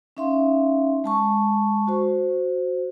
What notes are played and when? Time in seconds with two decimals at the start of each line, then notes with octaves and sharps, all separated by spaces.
0.17 C#4 D#4 E5 F5 C6
1.04 G#3 A5 C#6
1.87 F#4 C5